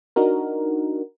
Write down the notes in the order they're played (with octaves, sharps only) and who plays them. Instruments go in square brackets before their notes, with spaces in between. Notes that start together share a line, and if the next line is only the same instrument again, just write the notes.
[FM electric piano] D4 D#4 F#4 A#4